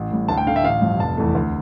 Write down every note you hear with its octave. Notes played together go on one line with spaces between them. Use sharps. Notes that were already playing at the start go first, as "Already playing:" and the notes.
Already playing: A1
A2 G3
D2 A5
G5
D3 A3 F5
E5
A1 F5
G2 F3
F1 A5
E2 E3 A3
D2